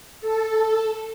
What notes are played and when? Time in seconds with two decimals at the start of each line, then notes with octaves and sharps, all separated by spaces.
0.21 A4